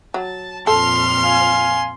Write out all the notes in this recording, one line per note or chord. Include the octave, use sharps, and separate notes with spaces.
F#3 A5
F2 A#2 A4 C6 F6
F5 G#5